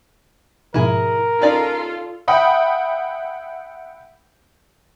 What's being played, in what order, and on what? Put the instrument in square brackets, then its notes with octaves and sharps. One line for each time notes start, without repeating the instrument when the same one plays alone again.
[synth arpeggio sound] G#2 B2 F3 [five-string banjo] E4 G#4 [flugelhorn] A#4
[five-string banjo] C#4 D#4 D5 [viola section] F4 A4
[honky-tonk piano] E5 F#5 G5 B5 D#6